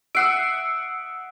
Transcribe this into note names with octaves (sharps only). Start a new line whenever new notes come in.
E5 F#5 D#6 E6 C7 D7